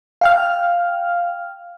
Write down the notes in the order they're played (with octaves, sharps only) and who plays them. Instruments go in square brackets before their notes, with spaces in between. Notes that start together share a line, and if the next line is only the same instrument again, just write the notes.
[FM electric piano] F5 G5 F6